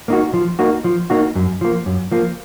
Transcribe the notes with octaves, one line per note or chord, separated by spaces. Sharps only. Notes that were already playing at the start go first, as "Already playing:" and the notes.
A#3 D#4 F#4
F3
A#3 D#4 F#4
F3
A#3 D#4 F#4
F#2
F3 A#3
F#2
F3 A#3